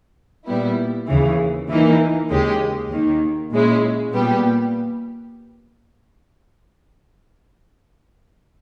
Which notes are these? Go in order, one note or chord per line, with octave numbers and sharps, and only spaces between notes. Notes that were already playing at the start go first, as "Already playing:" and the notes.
A#2 G3 B3 E4
D#2 C#3 E3
E3 A#3 D#4
D#2 C#3 G#3 C#4 G4
D#2 D#3 A#3
A#2 G#3 C#4 E4
A#2 G3 B3 G4